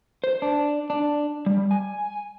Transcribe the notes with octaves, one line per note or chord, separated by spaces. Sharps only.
C5
D4
D4
G3
G#5